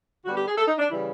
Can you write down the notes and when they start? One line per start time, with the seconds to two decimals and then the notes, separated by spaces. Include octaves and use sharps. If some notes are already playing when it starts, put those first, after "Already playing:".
0.24 D3 G3 B3 F#4
0.35 G4
0.46 G#4
0.56 A4
0.67 D#4
0.79 D4
0.89 C#3 E3 G3 E4